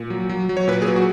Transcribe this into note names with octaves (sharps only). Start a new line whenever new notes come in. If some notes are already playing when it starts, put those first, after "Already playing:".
Already playing: A#2
F#3
F#3
F#3
C#5
A#2 B4
G#4
F#3
F#4